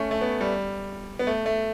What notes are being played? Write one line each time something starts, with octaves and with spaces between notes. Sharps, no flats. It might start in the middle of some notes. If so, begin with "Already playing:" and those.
Already playing: A3 C#4
A3
B3
G3
B3
A3
A3